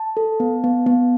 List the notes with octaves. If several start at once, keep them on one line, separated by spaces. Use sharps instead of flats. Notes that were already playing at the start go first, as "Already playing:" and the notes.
Already playing: A5
A4
B3
B3
B3